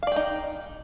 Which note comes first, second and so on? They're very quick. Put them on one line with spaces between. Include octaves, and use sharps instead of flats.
F5 D5 G5 D#4